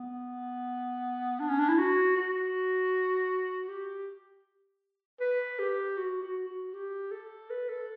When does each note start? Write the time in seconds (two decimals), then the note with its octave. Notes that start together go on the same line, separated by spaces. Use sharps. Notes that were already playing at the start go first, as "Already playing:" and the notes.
Already playing: B3
1.40 D4
1.49 C#4
1.59 D4
1.69 E4
1.78 F#4
2.16 F#4
3.68 G4
5.21 B4
5.59 G4
5.97 F#4
6.23 F#4
6.48 F#4
6.74 G4
7.11 A4
7.50 B4
7.69 A4